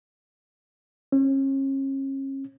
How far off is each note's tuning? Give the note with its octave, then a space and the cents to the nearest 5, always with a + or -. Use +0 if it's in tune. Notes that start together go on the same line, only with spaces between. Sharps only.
C#4 -35